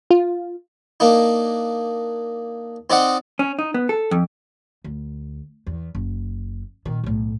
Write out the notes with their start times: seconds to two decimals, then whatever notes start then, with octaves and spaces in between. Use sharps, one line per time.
0.10 F4
1.00 A#3 D4 D#4
2.90 C4 D#4 D5 D#5 F#5
3.39 C#4
3.59 D#4
3.74 B3
3.89 A4
4.11 F2
4.84 D2
5.67 E2
5.95 F#1
6.85 A#2 D#3
7.04 B1 A2